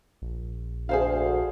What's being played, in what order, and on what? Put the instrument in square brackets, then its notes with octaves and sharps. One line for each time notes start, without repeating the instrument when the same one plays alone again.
[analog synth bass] A#1
[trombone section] D2 [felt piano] G#4 C5 F5